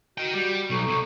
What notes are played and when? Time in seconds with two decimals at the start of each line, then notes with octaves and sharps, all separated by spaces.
0.18 F#4 D#5 G5 G6
0.34 G3
0.70 B1 A4 A#5 C#6
0.88 C2